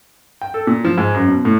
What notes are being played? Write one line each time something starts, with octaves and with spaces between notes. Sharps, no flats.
G5
A4
A#2
F3
G#2
F#2
B2
A2